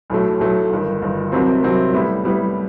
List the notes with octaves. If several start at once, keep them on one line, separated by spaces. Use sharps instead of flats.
B1 A2 F#3 A3
B1 A2 F#3 A3
G1 G2 D#3
G1 G2 D#3
C2 C3 D#3 F#3 C4
C2 C3 D#3 F#3 C4
A2 G3 B3 E4
A2 G3 B3 E4